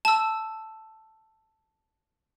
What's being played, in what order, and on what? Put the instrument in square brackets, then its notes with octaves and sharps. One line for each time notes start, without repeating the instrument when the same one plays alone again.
[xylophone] A5 E6